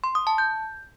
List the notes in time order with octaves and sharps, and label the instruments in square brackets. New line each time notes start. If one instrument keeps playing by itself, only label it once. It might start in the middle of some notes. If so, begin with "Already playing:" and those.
[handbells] C6
D#6
A5
G6